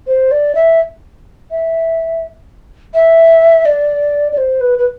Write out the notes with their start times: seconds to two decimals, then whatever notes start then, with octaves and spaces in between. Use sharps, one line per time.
0.07 C5
0.31 D5
0.55 E5
1.51 E5
2.94 E5
3.65 D5
4.32 D5
4.37 C5
4.61 B4
4.78 B4